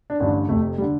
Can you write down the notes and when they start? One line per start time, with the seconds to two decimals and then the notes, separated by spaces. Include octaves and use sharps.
0.10 D4
0.20 A1 G2 D3 D4
0.48 F1 F2 C3 A3
0.78 G3
0.82 D3